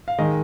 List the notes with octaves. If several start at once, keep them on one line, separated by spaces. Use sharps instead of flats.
F5
D#3 G#3 D#5